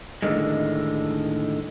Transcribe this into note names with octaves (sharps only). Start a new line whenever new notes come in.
A2 D3 D#3 G#3